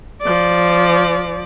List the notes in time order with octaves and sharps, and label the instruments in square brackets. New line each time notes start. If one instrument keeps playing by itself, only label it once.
[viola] F3 D5